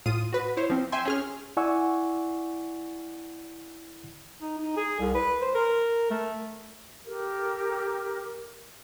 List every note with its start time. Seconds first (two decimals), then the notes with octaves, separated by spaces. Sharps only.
0.06 A2 F4 D#6 D#7
0.33 F#4 B4
0.57 E4 C5 C#5
0.70 F3 C4
0.92 E5 G5 G#5 C6
1.05 C#4 G#4 F6
1.57 E4 D5 F#5 G#5 C#6 E6
4.41 D#4
4.58 D#4
4.77 G#4
5.00 C2
5.15 B4
5.42 C5
5.55 A#4
6.10 A3
7.07 G4 A4 A#4